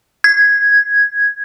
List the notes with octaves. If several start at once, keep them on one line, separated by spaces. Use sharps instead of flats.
G#6